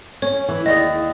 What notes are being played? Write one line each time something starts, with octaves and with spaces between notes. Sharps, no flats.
C#4 C#5
E3
D#2 G#4 D5 D#5